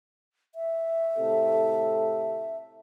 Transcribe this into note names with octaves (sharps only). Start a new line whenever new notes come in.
E5
A2 C3 A4